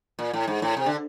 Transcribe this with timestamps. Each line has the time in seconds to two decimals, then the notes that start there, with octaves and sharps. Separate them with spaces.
0.19 A#2
0.33 A2
0.48 G#2
0.62 A2
0.77 C3
0.86 D3